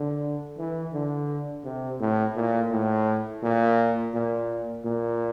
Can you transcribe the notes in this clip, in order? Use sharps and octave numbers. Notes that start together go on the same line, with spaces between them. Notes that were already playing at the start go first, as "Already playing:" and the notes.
Already playing: D3
E3
D3
C3
A2
A#2
A2
A#2
A#2
A#2